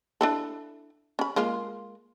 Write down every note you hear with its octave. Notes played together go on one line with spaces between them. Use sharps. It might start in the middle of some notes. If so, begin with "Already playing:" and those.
D4 E4 A4
C#4 B5
G#3 A#3 F4